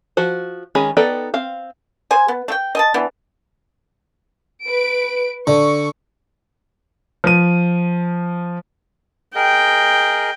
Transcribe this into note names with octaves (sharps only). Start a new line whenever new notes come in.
F3 F#4 C5
D#3 G#3 C#4 G#4 B5
B3 D#4 A4 D5 G5
C4 F5
G#4 C5 G#5
B3
A3 G5
D#5 G#5 A5
E3 B3 D4
B4 D7
D3 C#6
F3 D#7
G#4 A#4 D#5 G5